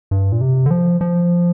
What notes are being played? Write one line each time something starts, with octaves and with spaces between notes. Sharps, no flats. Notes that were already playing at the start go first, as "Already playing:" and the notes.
G2
A#2
C3
D3
F3
F3